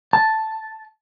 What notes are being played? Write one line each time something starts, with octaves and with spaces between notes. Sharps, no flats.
A5